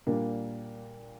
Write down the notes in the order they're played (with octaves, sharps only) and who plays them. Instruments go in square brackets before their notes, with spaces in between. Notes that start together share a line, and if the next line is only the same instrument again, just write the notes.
[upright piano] A#2 G3 A#3 D4